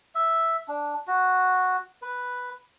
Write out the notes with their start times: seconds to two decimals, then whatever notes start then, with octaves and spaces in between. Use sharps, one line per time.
0.15 E5
0.68 D4
1.07 F#4
2.02 B4